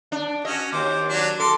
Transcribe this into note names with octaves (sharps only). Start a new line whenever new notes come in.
D4
C#4 F#4 D#5
D#2 C5 D6
F#3 D4
A4 C6 D6